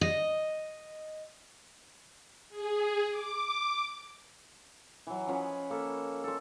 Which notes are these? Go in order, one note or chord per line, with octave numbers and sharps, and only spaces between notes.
D#5
G#4
D6
E3 F#3
F3 C#4 B4 D#5
A#3 A4
A4 C6